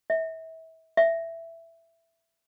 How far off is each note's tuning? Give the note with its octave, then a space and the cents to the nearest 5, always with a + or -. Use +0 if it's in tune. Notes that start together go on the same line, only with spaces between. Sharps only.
E5 -30
E5 +10